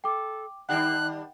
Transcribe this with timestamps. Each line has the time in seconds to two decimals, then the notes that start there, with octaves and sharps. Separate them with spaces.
0.04 A4 G5 D6
0.69 D#3 G3 D4 F#5 G5 F#6